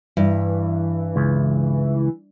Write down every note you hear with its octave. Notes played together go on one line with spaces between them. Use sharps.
G2 E3
C#2